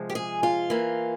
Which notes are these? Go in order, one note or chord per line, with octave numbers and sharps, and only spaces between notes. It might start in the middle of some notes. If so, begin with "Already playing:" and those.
Already playing: C3 F3 G#3
G4
G#4
F4
E3 A#3